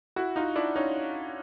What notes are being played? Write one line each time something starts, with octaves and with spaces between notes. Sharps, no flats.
E4 F#4
D#4 F4
D4 E4
C#4 D#4